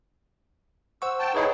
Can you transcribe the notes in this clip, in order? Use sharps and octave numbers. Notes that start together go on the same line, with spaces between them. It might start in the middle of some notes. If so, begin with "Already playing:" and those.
C5 F#5 C#6 E6
G5 A5
D#4 E4 G#4 B4 C#5 D#5